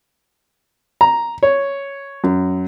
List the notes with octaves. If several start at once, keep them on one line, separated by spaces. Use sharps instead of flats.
A#5
C#5
F#2